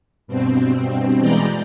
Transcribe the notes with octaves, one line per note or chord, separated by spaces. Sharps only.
G2 B2 C4
B2 E3 G#3 D5 A#5 G6